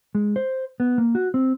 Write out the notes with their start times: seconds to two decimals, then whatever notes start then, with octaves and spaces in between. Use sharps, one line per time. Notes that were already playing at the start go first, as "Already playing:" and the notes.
0.15 G#3
0.36 C5
0.80 B3
0.98 A#3
1.15 F#4
1.34 C4